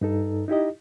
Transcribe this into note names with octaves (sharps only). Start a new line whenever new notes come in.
G2 D#4 A4
D#4 E4 G4 D#5